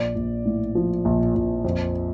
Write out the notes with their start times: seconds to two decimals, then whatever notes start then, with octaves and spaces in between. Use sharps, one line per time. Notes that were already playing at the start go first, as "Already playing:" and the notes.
Already playing: A#1 D5
0.16 A#1
0.45 A2
0.75 F3
1.05 A#1
1.35 A#1
1.64 F2